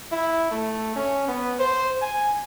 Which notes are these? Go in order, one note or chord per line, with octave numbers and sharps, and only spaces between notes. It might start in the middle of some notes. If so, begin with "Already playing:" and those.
E4
A3
C#4
B3
C5
G#5